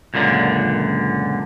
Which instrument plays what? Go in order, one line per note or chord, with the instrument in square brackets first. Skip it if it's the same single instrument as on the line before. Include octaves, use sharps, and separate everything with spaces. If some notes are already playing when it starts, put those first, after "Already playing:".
[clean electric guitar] C#2 F#2 A#2 D3